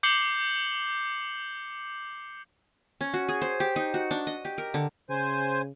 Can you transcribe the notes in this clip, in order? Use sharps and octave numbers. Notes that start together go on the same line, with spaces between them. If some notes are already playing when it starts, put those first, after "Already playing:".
D6 G6 C7 C#7 F#7 G7
C#4
F#4
G#4
C5
G4
D#4
F#4
D4
D#5
G4
A#4
D3
C#3 C5 G#5